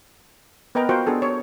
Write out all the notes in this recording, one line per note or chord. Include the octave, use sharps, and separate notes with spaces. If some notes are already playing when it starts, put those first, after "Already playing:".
B3 A#4 B4 D#5 G5 A#5
F4 F#4 A#4 C5 F#5 G5
B3 D4 G#4 A4
C#5